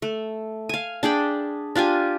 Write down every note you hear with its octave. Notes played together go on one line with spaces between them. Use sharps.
A3
F5 G#5
D4 G#4 G5 B5
D4 F4 G4 G#5